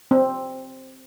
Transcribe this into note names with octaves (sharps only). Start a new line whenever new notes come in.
C4